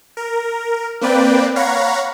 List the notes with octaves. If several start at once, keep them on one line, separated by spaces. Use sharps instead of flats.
A#4
A#3 C4 B4 D5 G5
C#5 F5 F#5 A#5 B5 C#6